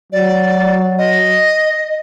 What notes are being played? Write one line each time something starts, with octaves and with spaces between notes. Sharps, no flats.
F#3 D5
D#5